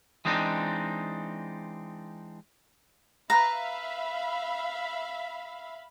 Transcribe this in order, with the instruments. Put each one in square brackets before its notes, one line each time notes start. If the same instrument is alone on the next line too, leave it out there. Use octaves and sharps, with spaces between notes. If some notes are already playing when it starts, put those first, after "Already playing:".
[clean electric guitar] E3 G#3 C4 D4 D#4
[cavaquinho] B4 A#5 [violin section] E5 F5 B5